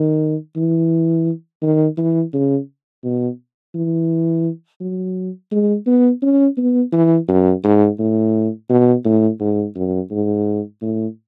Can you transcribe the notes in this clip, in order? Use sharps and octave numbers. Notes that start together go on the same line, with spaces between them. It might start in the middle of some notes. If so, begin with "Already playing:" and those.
Already playing: D#3
E3
D#3
E3
C#3
B2
E3
F#3
G#3
B3
C#4
B3
E3
F#2
G#2
A2
B2
A2
G#2
F#2
G#2
A2